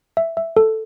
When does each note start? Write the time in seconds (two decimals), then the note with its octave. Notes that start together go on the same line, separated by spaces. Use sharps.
0.17 E5
0.37 E5
0.57 A4